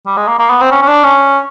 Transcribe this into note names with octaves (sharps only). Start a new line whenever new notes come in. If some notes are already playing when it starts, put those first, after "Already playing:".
G3
G#3
A#3
A#3
B3
C4
C#4
C#4
D4
C#4